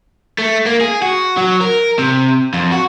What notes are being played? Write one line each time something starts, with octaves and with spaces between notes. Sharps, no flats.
A3
A#3
G#4
F#4
F#3
A#4
C3
F2
F#4